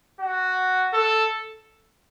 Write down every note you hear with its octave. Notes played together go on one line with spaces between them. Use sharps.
F#4
A4